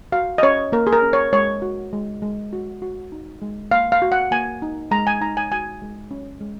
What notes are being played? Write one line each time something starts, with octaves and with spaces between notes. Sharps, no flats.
F#4 F5
D#5
C#4 C#5
A#3 A#4
G#4
A#4
C#4
C#5
G#3 C#5
F#4
G#3
G#3
F#4
F#4
D#4
G#3
A#3 F5
F5
F#4
F#5
A#3 G#5
D#4
G#3 A#5
G#5
D#4 A#5
G#5
F#4 G#5
G#3
C#4
G#3